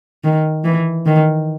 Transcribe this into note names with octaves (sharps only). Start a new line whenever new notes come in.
D#3
E3
D#3